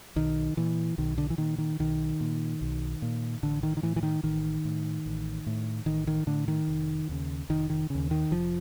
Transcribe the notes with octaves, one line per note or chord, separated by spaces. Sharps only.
B1 D#3
A#2 E3
B1 D#3
D3
E3
A#2 D#3
D#3
B1 D#3
A#2
B1
A#2
A1 D3
D#3
D#3
A2 E3
E3
D#3
A1 D#3
A2
A1
A2
A1 D#3
D#3
A2 D3
D#3
F1
D#2 C#3
F1 D#3
D#3
D#2 C#3
D#3
F1 F3